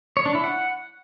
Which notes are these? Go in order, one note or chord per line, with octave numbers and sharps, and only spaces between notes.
C#5
D4
E4
F#5